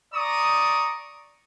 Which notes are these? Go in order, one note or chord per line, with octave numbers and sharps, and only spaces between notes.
D5 A#5 C#6 D#6